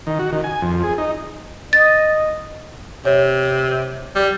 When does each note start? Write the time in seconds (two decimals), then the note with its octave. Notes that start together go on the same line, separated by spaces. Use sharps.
0.07 D#3
0.19 F#4
0.32 D#3
0.44 G#5
0.62 F2
0.84 G#4
0.98 D#4
1.73 D#5 A6
3.05 C3 C#5
4.15 G3